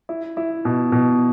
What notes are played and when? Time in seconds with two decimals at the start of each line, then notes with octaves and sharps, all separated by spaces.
0.09 E4
0.37 E4
0.65 B2
0.92 B2